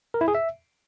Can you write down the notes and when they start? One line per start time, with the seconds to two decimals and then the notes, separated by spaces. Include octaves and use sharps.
0.14 A#4
0.21 E4
0.28 G#4
0.35 E5